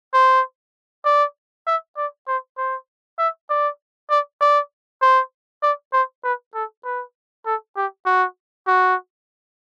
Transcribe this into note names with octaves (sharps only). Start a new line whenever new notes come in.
C5
D5
E5
D5
C5
C5
E5
D5
D5
D5
C5
D5
C5
B4
A4
B4
A4
G4
F#4
F#4